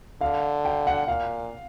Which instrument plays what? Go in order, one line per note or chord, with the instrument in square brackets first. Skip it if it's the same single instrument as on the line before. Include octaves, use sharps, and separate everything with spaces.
[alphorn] D3 [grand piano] F5
[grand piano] G5
F#5
[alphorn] A#2 [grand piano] F5